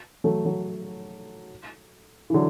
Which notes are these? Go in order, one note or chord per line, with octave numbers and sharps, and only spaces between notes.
F#3 A3
F#3 A3
E3
D3 F#3